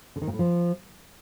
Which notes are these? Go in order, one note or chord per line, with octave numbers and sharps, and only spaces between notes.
D3
D#3
A#2
A2
F3